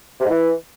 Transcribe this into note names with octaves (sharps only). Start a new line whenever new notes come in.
C3
G#2
E3